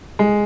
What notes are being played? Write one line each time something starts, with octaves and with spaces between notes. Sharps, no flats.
G#3